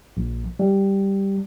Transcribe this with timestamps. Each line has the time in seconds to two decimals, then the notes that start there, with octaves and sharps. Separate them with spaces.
0.17 A#1
0.59 G3